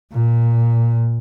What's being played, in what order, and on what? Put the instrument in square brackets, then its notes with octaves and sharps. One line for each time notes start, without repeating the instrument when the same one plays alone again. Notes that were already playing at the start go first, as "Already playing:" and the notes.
[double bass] A#2